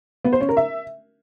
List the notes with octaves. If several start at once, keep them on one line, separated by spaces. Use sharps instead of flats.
B3
C5
C#4
A#4
E5